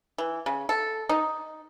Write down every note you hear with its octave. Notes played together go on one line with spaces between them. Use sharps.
E3
C#3
A4
D#4